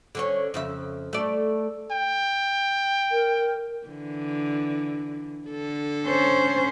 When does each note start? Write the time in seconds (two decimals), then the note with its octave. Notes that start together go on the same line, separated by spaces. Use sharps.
0.15 D3 C#4 C#5
0.54 F2 C#3 E5
1.13 A3 D5
1.91 G5
3.12 A#4
3.87 D3 E3
5.48 D3 A4
6.07 C#4 C5